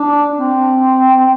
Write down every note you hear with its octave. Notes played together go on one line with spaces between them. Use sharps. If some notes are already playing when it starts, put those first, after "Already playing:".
Already playing: D4
C4